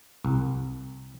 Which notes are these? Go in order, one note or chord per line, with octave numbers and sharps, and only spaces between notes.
C2